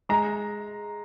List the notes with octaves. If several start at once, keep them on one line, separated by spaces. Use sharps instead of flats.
G#3 A#5